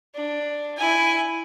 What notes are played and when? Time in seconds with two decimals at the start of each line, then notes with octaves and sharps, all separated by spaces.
0.15 D4
0.78 E4 G#5